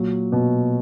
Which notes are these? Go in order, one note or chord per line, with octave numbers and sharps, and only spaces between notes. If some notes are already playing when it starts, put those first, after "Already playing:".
Already playing: A#2 F#3
B2